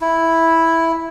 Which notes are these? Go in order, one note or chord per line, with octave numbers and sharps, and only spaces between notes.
E4